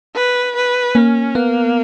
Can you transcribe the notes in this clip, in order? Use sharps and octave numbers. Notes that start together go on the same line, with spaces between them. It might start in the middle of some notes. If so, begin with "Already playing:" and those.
B4
B4
A#3 C#4
A#3 B3